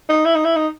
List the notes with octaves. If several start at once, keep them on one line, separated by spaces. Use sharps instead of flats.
D#4
E4
D#4
E4
D#4